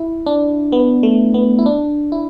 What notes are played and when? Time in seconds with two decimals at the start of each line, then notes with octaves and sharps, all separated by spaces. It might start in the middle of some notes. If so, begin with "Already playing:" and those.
Already playing: E4
0.26 D4
0.72 B3
1.03 A3
1.34 B3
1.59 E4
1.66 D4
2.12 E4